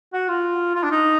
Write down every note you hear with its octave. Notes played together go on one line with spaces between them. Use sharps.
F#4
F4
F4
D4
D#4